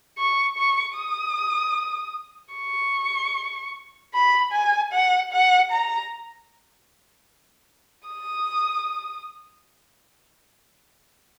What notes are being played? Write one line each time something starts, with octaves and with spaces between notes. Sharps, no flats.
C#6
C#6
D#6
C#6
B5
G#5
F#5
F#5
A#5
D#6